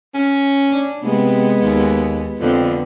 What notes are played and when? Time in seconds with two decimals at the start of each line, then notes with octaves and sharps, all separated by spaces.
0.15 C#4
0.69 D4
1.04 C3 G#3 B3
1.62 D#2
2.39 F2 D3 B3 C4